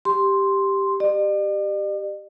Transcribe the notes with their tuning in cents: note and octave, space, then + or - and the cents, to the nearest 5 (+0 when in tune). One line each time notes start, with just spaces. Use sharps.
G4 +0 C6 +0
G4 +0 D5 +45